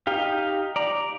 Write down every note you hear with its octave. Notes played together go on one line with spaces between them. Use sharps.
D#4 G4 F5
D5 A#5